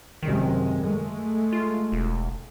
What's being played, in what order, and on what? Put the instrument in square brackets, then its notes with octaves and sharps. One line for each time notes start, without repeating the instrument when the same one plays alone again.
[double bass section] F#1 C3 G#3 [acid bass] D#3
[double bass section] G#3 A3
[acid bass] F4
E1